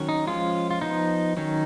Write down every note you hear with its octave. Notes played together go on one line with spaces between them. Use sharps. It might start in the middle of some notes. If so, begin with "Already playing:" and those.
Already playing: D#3 F#3 C#4
D#4
F3 G#3 C#4 F4
F4
F3 B3 D#4
D#3 F#3 C#4 D#4